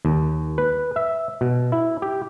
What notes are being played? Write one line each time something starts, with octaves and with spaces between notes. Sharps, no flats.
D#2
B4
E5
B2
E4
G4